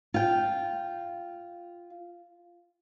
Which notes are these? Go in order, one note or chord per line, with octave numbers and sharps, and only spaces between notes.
F4 G5